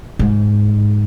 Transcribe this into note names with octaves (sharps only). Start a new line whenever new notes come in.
G#2